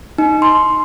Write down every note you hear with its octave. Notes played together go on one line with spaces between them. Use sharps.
D#4
C6